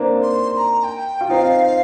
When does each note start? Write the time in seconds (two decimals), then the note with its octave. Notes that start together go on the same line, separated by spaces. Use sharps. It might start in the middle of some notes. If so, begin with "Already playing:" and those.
Already playing: A#3 C4 D4 D#4
0.22 C6
0.53 C6
0.58 A#5
0.84 G5
1.21 F4
1.30 C4 D#4 F5